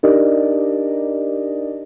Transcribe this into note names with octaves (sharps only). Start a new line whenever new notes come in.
D4 D#4 G4 A#4 D5 D#5